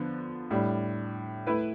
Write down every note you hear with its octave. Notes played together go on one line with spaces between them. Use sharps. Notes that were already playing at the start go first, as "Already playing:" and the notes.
Already playing: D3 F3 B3
A2 G3 D4
A3 E4 B4